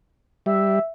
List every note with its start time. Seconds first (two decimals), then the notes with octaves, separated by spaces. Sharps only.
0.46 G3 E5